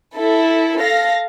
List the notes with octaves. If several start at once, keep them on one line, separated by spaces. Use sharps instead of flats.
E4 A4
A4 F5 A#6